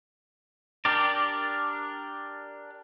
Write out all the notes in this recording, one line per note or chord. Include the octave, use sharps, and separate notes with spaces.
D4 G4 A#4 D5